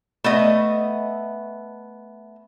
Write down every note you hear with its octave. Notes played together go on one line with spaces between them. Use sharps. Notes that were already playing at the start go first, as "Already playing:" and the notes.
A3 B3 D#5